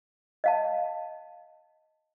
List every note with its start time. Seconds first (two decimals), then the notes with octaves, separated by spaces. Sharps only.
0.44 D#5 F5 A5